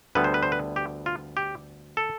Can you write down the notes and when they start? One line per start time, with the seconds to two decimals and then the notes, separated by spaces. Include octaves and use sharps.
0.15 D2 D3 G3 B3 B4
0.24 C5
0.34 B4
0.43 C5
0.52 B4
0.76 G4
1.06 F4
1.37 G4
1.97 A4